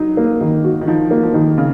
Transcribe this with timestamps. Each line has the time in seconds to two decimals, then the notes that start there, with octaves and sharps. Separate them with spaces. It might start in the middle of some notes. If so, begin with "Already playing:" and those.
Already playing: F#3 D#4
0.17 A#3
0.41 D#3
0.64 F#4
0.81 D#3
0.87 F3 D#4
1.11 A#3
1.23 F3
1.34 D#3
1.58 C#3